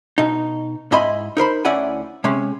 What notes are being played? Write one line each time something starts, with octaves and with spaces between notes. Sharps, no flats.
B2 D#4
G#2 E4 D#5 G#5 B5 C6
D#4 A#4 C5 B5
D2 C#4 E4 D5 F#5 G#5
C3 G#3 C#4